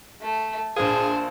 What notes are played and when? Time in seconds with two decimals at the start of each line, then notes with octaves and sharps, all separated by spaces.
0.22 A3
0.76 A#1 G#4 C5 F5 A5